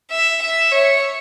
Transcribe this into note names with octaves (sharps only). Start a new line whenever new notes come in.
E5
E5
C#5